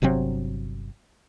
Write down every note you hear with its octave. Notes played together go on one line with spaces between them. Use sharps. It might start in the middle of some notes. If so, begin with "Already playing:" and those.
G1 C3 F#3 C4